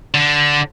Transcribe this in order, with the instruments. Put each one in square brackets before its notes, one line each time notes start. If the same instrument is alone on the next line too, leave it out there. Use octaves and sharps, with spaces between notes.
[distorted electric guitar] D3